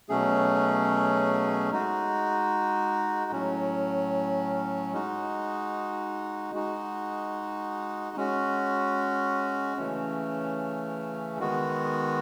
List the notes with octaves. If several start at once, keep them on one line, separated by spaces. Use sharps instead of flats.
B2 F#3 A3 C#4 G#4
G#3 D#4 F#4
A2 F#3 C#4
G#3 D#4 F#4
G#3 D#4 F#4
G#3 C#4 F#4
C#3 E3 A3 C#4
D#3 G#3 B3 F#4